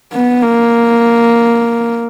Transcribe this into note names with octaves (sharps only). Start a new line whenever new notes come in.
B3
A#3